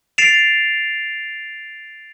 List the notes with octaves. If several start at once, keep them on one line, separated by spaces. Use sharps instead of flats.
A6 C7 D7 E7 F7